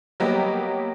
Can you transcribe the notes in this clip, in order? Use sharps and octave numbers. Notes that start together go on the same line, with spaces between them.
F#3 G3 A#3 B3 G4 D#5